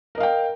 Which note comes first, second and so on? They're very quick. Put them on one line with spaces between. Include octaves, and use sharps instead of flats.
A#4 D#5 F5 G5